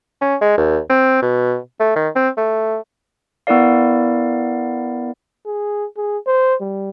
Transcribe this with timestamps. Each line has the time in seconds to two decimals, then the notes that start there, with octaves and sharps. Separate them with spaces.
0.21 C#4
0.41 G#3
0.58 D#2
0.90 C4
1.22 B2
1.80 A3
1.96 D#3
2.16 C4
2.37 A3
3.47 B3 E4 A#4 D5 F5
5.46 G#4
5.97 G#4
6.27 C5
6.61 G3